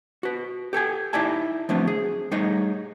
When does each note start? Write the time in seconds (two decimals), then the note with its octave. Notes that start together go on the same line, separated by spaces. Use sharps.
0.23 F#4 B4
0.73 G4 A4 G5 G#5
1.13 D#4 E4 D5 E5 G#5 A5
1.69 F3 F#3 A3 B3 C4 D4
1.88 G#4
2.31 G3 A3 D#4 G#4 C#5 D#5